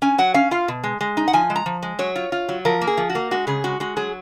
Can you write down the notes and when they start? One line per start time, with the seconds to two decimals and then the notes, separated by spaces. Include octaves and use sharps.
0.02 C#4 G#5
0.18 F#3 F#5
0.34 C#4 F5
0.51 F4 F5
0.68 B2
0.84 G#3
1.01 G#3
1.17 D#4
1.28 F#5
1.33 F3 G#5
1.50 G#3
1.56 A#5
1.66 F3
1.83 G#3
1.99 F#3 C#5
2.16 F4
2.32 F4
2.49 F#3
2.65 F3 A#4
2.81 A#3
2.87 G#4
2.97 F3
3.10 F#4
3.15 A#3
3.31 G#3 F#4
3.47 C#3 G#4
3.64 G#3 F#4
3.80 G#3 F#4
3.97 F#3 G#4